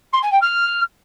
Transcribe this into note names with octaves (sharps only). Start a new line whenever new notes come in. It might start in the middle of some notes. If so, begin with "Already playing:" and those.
C6
G#5
G5
F6